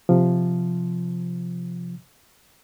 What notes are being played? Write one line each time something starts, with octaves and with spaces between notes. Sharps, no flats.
C3 F3